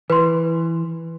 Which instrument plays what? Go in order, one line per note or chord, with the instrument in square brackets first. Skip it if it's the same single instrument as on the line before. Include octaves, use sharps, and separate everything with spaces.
[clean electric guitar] E3 [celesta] B4 C6